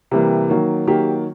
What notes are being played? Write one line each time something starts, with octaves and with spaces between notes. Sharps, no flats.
C3 E3 G3 A#3
D#3 F#3 A#3
D#3 F#3 A#3 G4